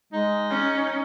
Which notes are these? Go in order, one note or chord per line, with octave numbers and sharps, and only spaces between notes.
G#3 D#4
C#4